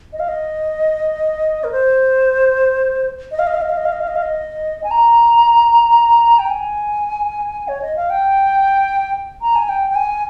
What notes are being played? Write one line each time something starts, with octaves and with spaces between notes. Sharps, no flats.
D#5
F5
D#5
A#4
C5
D#5
F5
D#5
F5
D#5
F5
D#5
F5
D#5
F5
D#5
F5
D#5
G#5
A#5
G5
G#5
C#5
D#5
F5
G5
A#5
G#5
G5
G5
G#5